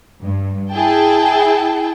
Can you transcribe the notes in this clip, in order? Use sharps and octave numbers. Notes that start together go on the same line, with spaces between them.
G2
E4 G#4 G5 A5